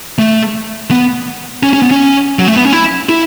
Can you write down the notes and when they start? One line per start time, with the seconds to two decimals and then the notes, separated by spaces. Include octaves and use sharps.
0.18 A3
0.91 B3
1.63 C#4
1.73 C#4
1.82 B3
1.91 C#4
2.39 F#3
2.47 A3
2.56 B3
2.65 C#4
2.72 E4
3.09 E4